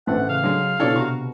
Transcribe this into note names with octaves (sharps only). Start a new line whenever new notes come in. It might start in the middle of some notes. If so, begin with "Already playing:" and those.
E1 A1 D3 A3 C4 F#5
C#3 F5
D3 F#3 G#3
B2 D3 E4 A4 C#5 D5
C3 F#4 A#5 C#6